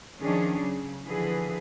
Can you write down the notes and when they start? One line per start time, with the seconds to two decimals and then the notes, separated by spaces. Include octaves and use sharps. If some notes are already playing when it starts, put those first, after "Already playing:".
0.20 D#3 F3 C#4 D4 G#4
0.59 C#3 F#3
1.04 D3 E3 F3 G#4 B4